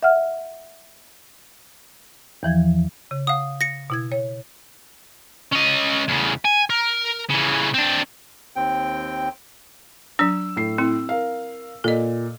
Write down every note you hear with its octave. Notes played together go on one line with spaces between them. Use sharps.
E5 F#5 F6
E2 E3 F3 G#6
C#3
F5 F#5 D#6
A#6 C#7
B2 E4 G#6
C#5
C#4 D#5
E2 C#3
G#5
A#4
C#3 E3
C4 D4
D#2 C4 G5
F#3 D4 E6
A2 C7
C4 E4
A#4 F5
A#2 A4 D#5